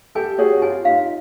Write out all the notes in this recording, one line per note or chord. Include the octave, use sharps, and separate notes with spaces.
G4 A4 G#5
F#4 G#4 C#5
F#4
F4 G4 G#5
D#4 F4 F5